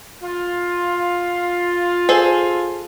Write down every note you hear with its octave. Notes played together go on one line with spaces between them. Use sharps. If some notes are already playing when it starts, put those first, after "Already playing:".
F4
G#4 A4 C5